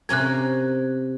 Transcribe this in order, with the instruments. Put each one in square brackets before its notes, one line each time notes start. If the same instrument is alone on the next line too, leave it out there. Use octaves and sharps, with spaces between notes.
[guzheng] C3 C#4 A#4 [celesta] F#6 G#6